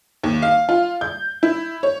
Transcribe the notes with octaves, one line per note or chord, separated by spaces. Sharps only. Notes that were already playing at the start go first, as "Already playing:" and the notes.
D#2
F5
F4
G6
E4
C#5